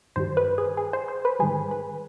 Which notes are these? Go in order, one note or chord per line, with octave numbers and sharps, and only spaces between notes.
G2 D#3 G3 C5
B4
G#4
G#4
C5
C5
B4
G#2 D#3 G3 G#4
B4